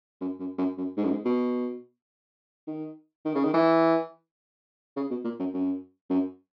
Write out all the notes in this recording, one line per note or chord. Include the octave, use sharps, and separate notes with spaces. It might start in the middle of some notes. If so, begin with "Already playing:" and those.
F#2
F#2
F#2
F#2
G#2
F#2
G#2
B2
D#3
D#3
C#3
D#3
E3
C#3
B2
A#2
F#2
F#2
F#2